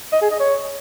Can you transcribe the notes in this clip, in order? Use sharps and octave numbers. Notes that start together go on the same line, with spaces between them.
D#5
G#4
D#5
C#5